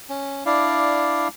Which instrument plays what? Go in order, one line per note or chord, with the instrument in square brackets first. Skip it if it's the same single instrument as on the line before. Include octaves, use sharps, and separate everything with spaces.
[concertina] C#4
D4 E4 D5 F5